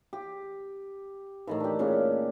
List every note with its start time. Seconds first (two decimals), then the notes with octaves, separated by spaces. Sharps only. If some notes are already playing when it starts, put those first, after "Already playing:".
0.13 G4
1.47 A2 D#3 E3
1.60 D4 G4
1.79 A#2 C#3 C#4 D4